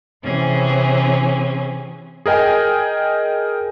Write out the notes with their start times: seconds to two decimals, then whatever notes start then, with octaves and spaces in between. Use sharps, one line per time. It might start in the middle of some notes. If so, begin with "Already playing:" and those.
0.23 C3 E3 C4 C#4 G#4
2.26 G#4 A#4 D#5 G5 G#5